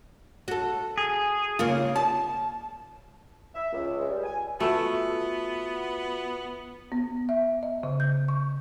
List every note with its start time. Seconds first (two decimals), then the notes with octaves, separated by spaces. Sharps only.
0.48 F#4 A4
0.98 G#4
1.59 C#3 A#3 F4
1.96 A5
3.55 E5
3.71 C#2
3.98 G#3
4.09 G3
4.23 G#5
4.60 A3 B3 F4 F#4 E5
6.92 B3
7.29 E5
7.63 D#5
7.83 C#3
8.00 G6
8.28 C#6